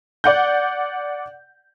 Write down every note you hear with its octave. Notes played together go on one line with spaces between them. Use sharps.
D5 F#5 G6